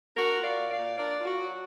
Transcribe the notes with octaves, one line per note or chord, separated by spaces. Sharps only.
D4 F#4 A#4
F4
D5 F5
A#2
D5 F5
A#2
D4 A#4 D5
F4
F#4
F#3